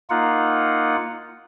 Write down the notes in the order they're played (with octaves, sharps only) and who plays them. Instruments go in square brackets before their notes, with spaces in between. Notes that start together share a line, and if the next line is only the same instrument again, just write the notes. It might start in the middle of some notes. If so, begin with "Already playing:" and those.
[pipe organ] A#3 D#4 F4 F#5